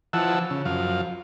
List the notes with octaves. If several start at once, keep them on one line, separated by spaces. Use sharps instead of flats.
E3 F3 F#5 A5 E6
C#3
F#2 F3 F5